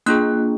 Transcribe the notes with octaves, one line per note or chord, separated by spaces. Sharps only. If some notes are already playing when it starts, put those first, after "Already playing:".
A#3 D4 F4 G#4 F#6